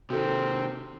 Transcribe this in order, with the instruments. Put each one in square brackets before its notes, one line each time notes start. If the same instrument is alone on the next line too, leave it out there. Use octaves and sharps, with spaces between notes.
[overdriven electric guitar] C3 D#3 [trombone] C4 [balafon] F#4 A4